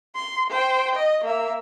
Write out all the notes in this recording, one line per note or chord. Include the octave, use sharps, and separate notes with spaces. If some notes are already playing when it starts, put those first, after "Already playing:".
C6
C5 G5
D#5
A#3 E5